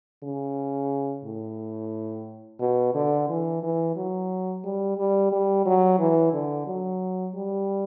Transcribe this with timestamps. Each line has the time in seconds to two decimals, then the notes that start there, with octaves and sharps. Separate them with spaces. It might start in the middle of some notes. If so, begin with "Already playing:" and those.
0.23 C#3
1.25 A2
2.60 B2
2.94 D3
3.29 E3
3.63 E3
3.96 F#3
4.65 G3
4.98 G3
5.32 G3
5.66 F#3
5.99 E3
6.33 D3
6.67 F#3
7.35 G3